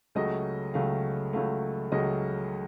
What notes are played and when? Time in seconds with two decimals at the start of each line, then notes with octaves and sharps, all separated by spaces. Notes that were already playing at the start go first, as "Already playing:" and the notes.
0.15 C#2 C#3 F#3 A3 D#5
0.74 C#2 C#3 F#3 A3 F5
1.33 C#2 C#3 F#3 A3 F5
1.92 C#2 C#3 F#3 A3 D#5